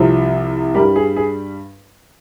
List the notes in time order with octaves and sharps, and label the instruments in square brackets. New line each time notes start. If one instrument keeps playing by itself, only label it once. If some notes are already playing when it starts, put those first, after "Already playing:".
Already playing: [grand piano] C2 C3 F3
G3 G4 A#4
G2
G#4
G#4